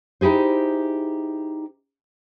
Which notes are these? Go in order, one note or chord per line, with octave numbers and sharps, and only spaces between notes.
D#4 E4 G4 G#4 C5